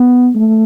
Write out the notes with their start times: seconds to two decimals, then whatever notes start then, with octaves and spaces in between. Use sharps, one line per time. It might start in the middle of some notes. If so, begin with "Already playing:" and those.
Already playing: B3
0.36 A3